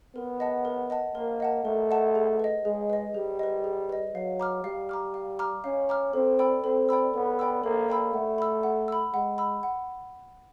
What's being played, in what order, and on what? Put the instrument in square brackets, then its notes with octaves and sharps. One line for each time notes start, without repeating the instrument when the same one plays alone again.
[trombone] B3 [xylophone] A#4
[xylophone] D#5 F#5 A5
A#4
D#5 F#5 A5
[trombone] A#3 [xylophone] A#4
[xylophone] D#5 F#5 A5
[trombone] A3 [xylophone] A#4
[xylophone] D#5 F#5 A5
G#4
B4 D#5
[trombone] G#3 [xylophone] G#4
[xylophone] B4 D#5
[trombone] G3 [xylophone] G#4
[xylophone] B4 D#5
G#4
B4 D#5
[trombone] F#3 [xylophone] F5
[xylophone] A#5 D6 F6
[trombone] G3 [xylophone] F5
[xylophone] A#5 D6 F6
F5
A#5 D6 F6
[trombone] C#4 [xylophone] F5
[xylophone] A#5 D6 F6
[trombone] C4 [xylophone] A4
[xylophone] D5 G5 B5 E6
[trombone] C4 [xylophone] A4
[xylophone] D5 G5 B5 E6
[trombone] B3 [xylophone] A4
[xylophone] D5 G5 B5 E6
[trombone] A#3 [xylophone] A4
[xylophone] D5 G5 B5 E6
[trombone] A3 [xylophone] F#5
[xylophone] B5 E6
F#5
B5 E6
[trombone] G#3 [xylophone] F#5
[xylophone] B5 E6
F#5